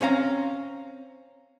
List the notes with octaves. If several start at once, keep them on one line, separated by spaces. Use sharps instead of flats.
C4 C#4 F5 A#5